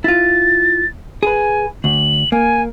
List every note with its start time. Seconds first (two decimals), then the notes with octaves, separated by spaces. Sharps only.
0.04 E4 F4 A6
1.23 G#4 B4 G#5
1.84 D2 F#7
2.32 A#3 G#5